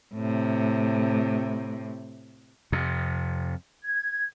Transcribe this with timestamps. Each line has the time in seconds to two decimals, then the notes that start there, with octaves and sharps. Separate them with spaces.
0.15 A2 C3
2.72 F2 C3
3.84 G#6